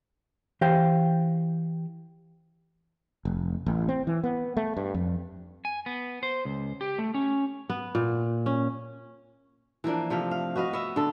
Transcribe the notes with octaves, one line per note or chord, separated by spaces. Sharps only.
E3 G4 C5 F5 G5
F1
A1
C4
E3
B3
A3
G2
F2
G#5
B3
C5
C#2
G4
A3
C#4
B3
A#2
C#4
E3 F3 A#3 D4
C3 F3 A3 F5
F5
F#4 B4 D#5 F5
B3 E5
D3 A4